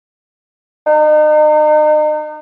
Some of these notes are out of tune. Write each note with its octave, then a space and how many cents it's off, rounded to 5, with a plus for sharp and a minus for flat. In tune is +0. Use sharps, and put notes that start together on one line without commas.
D#4 -35